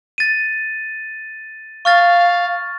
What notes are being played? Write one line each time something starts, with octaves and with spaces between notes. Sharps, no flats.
A6 D#7
F5 C#6 F6 A6